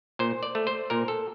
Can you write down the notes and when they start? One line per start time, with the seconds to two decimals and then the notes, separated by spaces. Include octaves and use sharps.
0.19 A#2 C5
0.43 D5
0.55 A3
0.67 C5
0.90 A#2 A#4
1.08 A4